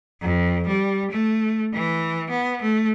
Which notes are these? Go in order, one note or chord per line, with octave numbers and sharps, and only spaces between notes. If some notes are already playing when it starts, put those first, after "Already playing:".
F2
G3
A3
E3
B3
A3